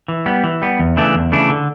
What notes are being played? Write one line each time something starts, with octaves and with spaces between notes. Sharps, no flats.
E3
G3 B3
E3
G3 B3
E2
C#3 E3 A3 D4
E2
C#3 E3 A3 D4
D3